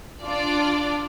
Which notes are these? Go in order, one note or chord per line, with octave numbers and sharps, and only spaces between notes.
D4 F4 D5 D6